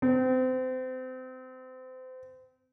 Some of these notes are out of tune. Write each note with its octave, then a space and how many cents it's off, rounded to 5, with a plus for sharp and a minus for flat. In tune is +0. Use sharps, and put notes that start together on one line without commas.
C4 -30